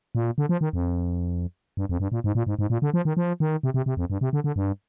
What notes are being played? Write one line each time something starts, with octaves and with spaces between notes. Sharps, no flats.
A#2
D3
F3
D#3
F2
G2
F2
G2
A#2
G#2
A#2
G#2
G#2
A#2
D3
F3
D#3
F3
D#3
C3
C3
C3
F2
G2
C3
D3
D3
G2